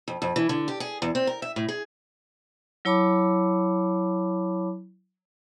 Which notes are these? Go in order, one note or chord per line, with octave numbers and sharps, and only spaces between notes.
F2
F2
E3
D3
G4
G#4
E2
C4
A#4
E5
A2
G#4
F#3 E4 C#5 A5 B5 D6